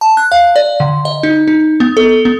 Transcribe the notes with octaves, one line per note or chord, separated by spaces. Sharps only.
A5
F#6
F5
D5
D3
D#5
D#4
D#4
B3
A4
B3